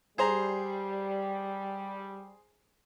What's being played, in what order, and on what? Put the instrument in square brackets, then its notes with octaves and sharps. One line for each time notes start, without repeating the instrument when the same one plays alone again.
[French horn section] G3 [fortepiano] G#4 C5 A#5